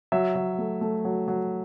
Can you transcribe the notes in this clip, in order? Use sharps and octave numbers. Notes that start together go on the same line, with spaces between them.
F#3 E5
F#3
A3
A3
F#3
F#3